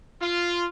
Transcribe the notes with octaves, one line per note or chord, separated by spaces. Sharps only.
F4